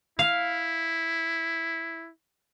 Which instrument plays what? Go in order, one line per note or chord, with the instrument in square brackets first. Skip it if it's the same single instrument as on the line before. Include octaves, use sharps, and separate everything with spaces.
[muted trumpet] E4 [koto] F5